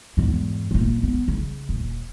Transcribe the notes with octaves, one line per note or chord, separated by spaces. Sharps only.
E2 G#2
A#1 A#3
B3
C#3
D#1